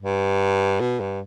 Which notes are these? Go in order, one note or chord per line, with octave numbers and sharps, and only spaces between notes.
G2
B2
G2